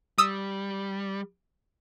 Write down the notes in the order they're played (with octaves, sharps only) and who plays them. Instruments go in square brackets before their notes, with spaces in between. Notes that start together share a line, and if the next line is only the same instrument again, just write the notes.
[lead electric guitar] G3 [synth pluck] D#6 E6